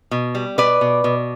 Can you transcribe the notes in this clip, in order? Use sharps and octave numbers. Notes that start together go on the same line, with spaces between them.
B2
G3
B2 B4 D5
B2
B2